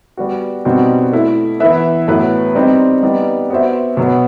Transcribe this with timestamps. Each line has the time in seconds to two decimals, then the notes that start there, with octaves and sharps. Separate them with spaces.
0.17 G3 B3 F#4
0.65 B2 G3 C4 D#4 F#4
1.13 A3 E4 A4
1.60 E3 B3 E4 B4 E5
2.07 A2 F#3 B3 E4 B4
2.55 G3 C4 D#4
3.03 G3 B3 D#4
3.50 B3 F#4 C5 E5
3.97 B2 F#3 B3